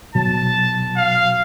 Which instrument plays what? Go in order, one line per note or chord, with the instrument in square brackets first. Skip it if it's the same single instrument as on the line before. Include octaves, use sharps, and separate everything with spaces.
[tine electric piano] B2 F#3 [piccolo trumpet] A5
[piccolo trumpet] F5